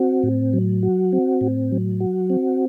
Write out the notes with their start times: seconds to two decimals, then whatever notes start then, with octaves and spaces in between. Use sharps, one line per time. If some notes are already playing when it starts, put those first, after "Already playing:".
Already playing: C4 F#4
0.23 A2
0.53 F#3
0.83 F#4
1.13 C4
1.41 A2
1.72 F#3
2.00 F#4
2.30 C4